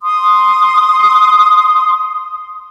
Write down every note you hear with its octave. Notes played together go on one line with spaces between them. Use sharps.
C6 D#6